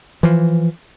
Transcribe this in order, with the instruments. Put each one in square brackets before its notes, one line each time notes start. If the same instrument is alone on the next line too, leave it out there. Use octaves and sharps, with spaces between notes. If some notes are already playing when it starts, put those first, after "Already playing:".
[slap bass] E3 F3